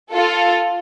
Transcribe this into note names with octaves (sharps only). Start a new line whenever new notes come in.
F4 A4